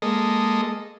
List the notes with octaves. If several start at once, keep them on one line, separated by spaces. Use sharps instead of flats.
G#3 A#3 A4 D#5